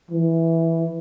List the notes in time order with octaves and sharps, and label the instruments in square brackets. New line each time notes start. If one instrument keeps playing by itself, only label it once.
[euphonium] E3